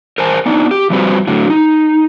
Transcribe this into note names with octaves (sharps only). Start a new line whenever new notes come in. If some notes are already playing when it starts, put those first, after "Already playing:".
A#4 C5 G#5 A5
B3 D4 D#4
G4
F3 G3 C4 F#4 B4 C5
A2 D3 F#3
D#4